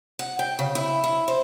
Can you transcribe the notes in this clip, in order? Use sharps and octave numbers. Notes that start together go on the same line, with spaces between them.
F#5
G5
C#3
E4
E4
C5